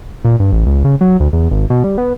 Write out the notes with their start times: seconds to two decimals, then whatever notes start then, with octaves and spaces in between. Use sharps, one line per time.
0.25 A#2
0.40 G2
0.52 A1
0.66 C#2
0.85 C#3
1.01 F#3
1.20 D2
1.33 E2
1.51 G#1
1.70 B2
1.84 G3
1.98 B3